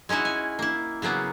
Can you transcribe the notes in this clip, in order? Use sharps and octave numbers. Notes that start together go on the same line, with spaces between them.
G#3 C#4 D#4 E4 F#4
G#5
A#3 E4
C#3 F#3 A#3 B3